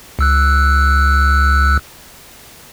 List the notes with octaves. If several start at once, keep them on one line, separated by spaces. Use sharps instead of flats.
C#2 E6 F#6